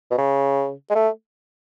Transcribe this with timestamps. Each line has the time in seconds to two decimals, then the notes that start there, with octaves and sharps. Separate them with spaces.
0.11 B2
0.18 C#3
0.90 G#3
0.95 A3